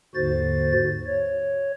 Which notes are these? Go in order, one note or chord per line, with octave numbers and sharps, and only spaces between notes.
D#2 G#2 D3 F#4 C5 A6
C#5